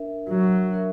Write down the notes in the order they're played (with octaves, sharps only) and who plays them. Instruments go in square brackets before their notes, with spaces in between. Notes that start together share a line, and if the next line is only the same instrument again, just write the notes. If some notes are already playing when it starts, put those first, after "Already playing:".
Already playing: [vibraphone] D4 A#4 E5
[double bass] F#3
[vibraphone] D4 A#4 E5